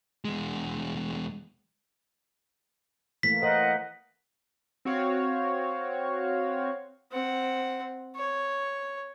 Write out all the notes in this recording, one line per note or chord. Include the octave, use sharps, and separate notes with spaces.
E2 G#3
E3 A3 A#3 B6
A#4 C5 D#5 F#5
C4 F#4 C#5 F5
C4 F#5
C#5